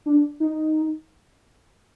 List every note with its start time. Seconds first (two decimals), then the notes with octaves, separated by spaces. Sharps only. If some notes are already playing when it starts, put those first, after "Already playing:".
0.06 D4
0.40 D#4